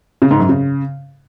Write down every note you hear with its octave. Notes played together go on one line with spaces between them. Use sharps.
C#3
G#2
F#2
C#3